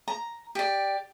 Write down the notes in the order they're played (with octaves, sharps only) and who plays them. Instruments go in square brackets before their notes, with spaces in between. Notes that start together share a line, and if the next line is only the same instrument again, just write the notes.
[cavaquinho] A#5
G4 D5